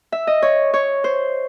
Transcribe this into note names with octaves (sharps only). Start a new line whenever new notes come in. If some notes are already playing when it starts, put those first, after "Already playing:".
E5
D#5
C#5
C#5
C5